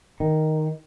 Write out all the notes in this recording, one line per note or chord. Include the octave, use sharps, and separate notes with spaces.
D#3